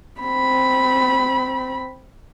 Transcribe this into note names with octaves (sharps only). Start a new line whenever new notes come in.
C4 B5